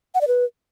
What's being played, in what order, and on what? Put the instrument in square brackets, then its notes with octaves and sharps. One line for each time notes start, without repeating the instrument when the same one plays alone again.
[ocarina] F#5
D5
B4